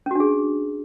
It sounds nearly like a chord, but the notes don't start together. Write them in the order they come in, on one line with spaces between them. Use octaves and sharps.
C#4 F#4 D4 G#4